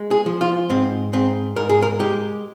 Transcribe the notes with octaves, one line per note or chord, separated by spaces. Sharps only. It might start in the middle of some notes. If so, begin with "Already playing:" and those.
Already playing: G#3
G#4
F3
F4
G#2 C4
G#2 C4
G#2 A#4
G#4
A#4
G#3 G4